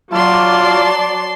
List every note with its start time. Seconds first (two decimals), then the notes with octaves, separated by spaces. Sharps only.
0.12 F#3 F4 D5 A5 C6